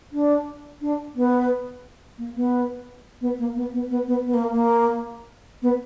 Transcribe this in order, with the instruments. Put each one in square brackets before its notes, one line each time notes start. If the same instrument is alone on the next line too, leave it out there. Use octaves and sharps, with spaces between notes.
[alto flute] D4
D4
B3
A#3
B3
B3
A#3
B3
B3
B3
B3
B3
A#3
A#3
B3